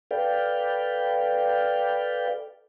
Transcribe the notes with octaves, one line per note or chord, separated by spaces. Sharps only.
A4 B4 D5 F5 G5